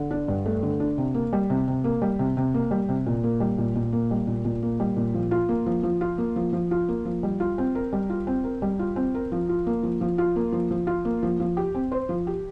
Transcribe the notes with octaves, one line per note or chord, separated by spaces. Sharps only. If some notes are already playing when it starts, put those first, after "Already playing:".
Already playing: D3
D4
G2
A3
D3
D4
C3
A#3
G3
C3
C3
A#3
G3
C3
C3
A#3
G3
C3
A#2
A#3
G3
A#2
A#2
A#3
G3
A#2
A#2
A#3
G3
A#2
F3
F4
A#3
F3
F3
F4
A#3
F3
F3
F4
A#3
F3
G3
F4
C4
A#4
G3
F4
C4
A#4
G3
F4
C4
A#4
F3
F4
A#3
F3
F3
F4
A#3
F3
F3
F4
A#3
F3
F3
G4
C4
C5
F3
G4